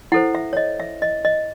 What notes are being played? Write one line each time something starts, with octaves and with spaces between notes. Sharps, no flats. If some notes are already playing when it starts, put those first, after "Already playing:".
E4 A4 C5 F#5
E5
C#5
D#5
E5
D#5
D#5